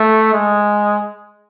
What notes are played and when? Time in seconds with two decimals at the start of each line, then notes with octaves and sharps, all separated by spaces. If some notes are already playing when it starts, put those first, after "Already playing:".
Already playing: A3
0.33 G#3